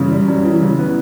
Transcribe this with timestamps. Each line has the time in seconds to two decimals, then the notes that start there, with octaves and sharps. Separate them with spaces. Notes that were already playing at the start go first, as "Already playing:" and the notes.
Already playing: F#2 C#3 E3 G3
0.11 G3
0.28 F#2
0.45 E3
0.62 C#3
0.79 B3